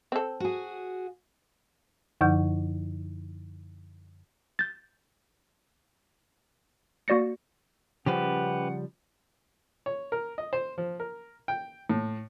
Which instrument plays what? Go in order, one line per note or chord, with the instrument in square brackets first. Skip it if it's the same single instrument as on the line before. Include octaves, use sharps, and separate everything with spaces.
[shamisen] C4 A4
[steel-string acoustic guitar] F#4 G#4
[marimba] F#2 D3 F3 D#4 F#5 G6
[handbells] G6 A6
A#3 F#4 D5 A#6 C#7
[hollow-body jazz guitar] C#3 F3 G3 [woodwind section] C#4 F#5 [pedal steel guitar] G4 B4
[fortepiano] C#5
A#4
D#5
C5
F3
A#4
G5
A2